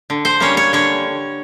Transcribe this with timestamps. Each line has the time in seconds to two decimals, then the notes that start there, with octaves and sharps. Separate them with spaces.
0.10 D3
0.25 C5
0.40 G3 A#3 C#4 C#5
0.57 C#5
0.73 D3 C#5